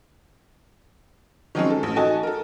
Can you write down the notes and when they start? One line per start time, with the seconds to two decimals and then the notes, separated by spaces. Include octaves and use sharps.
1.55 D#3 F3 F#3 G#3 C4 C#4
1.70 A4
1.83 A1
1.96 D#4 F#4 A4 D#5 G#5 A5
2.23 A4 A#4